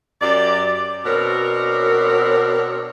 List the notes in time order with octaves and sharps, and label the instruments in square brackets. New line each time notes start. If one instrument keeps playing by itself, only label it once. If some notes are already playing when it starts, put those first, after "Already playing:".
[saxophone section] F#2 G4 D5
B2 C4 D4 A#4 C#5